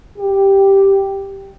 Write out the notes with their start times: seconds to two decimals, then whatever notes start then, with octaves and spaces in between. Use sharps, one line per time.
0.18 G4